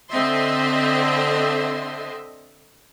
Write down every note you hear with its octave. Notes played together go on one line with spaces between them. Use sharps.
D3 C4 D#5 E5 C6